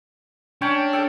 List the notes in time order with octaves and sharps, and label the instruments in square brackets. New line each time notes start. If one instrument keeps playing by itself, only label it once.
[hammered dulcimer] C#4 C#5 G5 [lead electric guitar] D4
[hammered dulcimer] A4 G5